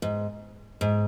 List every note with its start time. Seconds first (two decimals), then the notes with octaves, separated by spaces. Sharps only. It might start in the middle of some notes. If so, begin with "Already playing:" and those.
0.02 G#2
0.81 G#2